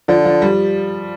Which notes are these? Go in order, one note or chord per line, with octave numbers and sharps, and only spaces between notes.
D3 F3
F3
G3